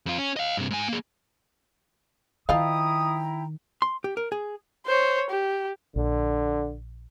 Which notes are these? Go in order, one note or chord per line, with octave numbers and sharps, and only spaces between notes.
F2 F4
C#4
D#5 F5
G2 C3
G#2 G#5
A#3 G#4
D#3 F3 E4 D#5 F5 G5 A#5 D#6
C6
G4
A#4
G#4
C5 C#5
G4
A#1 D3